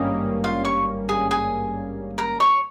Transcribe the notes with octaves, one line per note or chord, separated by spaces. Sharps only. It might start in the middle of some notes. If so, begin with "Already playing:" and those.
Already playing: G#1 G2 G3 A#3 C#4 D#5
F4 F5
C#5 C#6
G#4 G#5
G#4 G#5
A#4 A#5
C#5 C#6